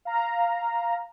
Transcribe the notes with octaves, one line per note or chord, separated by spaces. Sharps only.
F5 A#5